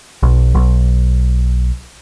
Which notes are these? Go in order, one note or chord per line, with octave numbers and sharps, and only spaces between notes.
B1
B1